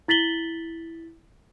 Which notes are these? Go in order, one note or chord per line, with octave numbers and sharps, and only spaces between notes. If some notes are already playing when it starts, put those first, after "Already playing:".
E4 A6 B6 F#7 G7